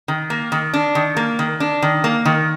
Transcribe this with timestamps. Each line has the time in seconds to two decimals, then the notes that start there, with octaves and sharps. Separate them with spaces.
0.08 D#3
0.30 A#3
0.52 D#3
0.74 D4
0.95 D#3
1.17 A#3
1.39 D#3
1.60 D4
1.82 D#3
2.04 A#3
2.25 D#3